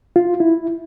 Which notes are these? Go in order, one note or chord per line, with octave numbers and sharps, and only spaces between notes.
F4
E4